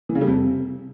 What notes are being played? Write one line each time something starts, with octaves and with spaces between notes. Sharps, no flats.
E3
C#3
G3
F2
C3